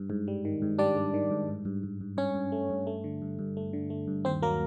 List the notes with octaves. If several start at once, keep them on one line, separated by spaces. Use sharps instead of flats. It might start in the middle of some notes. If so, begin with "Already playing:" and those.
Already playing: G2
G#2
G3
D#3
G#2
G3 D4 D5
G3
D#3
G#2
G2
G2
G2
G2
G2 C#4 C#5
G2
A3
G2
A3
D3
G2
G2
A3
D3
A3
G2
D#2 C4 C5
F#3 A#3 A#4